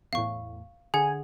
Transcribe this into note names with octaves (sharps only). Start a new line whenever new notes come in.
E2 A2 F5 C#6
D3 G#4 F#5 G#5